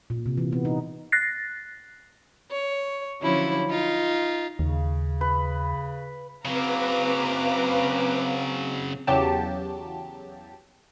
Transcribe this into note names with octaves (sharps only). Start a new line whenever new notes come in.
A#2
C3
E3
B3
D#4
F#6 A6 A#6 C7
C#5
D3 F3 F#3 C#4 E4
D#4 F4
D#2 C#3
B4
C#3 F#3 C4 B4 F5 A#5 D6
E2 C#3 F#3 G4 A5